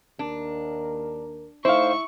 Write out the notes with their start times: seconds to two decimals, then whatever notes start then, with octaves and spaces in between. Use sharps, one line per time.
0.19 D#2 D4 A#4
1.65 A2 D#4 E4 C5 F5 C#6